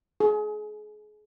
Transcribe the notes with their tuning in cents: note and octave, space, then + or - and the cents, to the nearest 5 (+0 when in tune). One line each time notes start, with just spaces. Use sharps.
G#4 +30